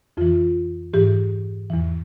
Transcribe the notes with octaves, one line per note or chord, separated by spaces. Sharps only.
F2 E3 F4
G#2 E3 G4
E2 E3